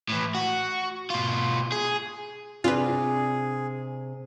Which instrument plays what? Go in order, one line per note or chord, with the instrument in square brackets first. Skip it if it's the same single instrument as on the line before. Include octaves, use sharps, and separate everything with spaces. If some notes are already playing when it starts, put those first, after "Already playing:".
[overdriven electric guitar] A2 E3
F#4
B2 F4
G#4
[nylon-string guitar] C3 C4 D4 [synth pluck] F4 B4 [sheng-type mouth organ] G#4